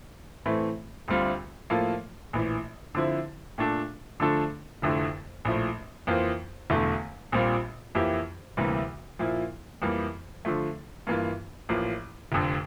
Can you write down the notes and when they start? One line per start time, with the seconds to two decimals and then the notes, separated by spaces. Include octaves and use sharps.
0.45 A2 E3 A3 C4
1.08 D2 D3 G3 C4 F4
1.70 A2 F3 A#3 F4 A4
2.33 A#1 A2 E3
2.95 D3 F3 C4 E4
3.58 A#2 A3 D4 A4
4.20 D3 F3 A3 D4 A4
4.82 F1 F2 D3 A3 E4
5.45 A#1 A2 F3 A3
6.07 F2 E3 A#3 F4 C5
6.70 E1 E2 D3 A3
7.32 A#1 A#2 G3 C4 F4
7.95 F2 E3 A#3 E4 G4
8.57 D2 C3 E3 G3 A#3
9.19 A#2 F3 A#3 E4
9.82 F2 E3 G3 A#3
10.45 D3 F3 A3
11.07 G2 E3 A#3 F4
11.69 A1 A2 F3 A#3
12.32 F1 F2 D3